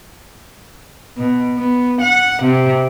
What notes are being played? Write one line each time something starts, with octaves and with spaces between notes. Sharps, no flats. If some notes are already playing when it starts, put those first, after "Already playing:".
B2
B3
F#5
C3